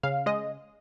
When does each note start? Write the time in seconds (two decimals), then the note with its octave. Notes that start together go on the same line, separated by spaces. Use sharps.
0.03 C#3 F5
0.26 G#3 D#5